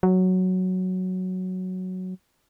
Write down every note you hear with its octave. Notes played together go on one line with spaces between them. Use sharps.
F#3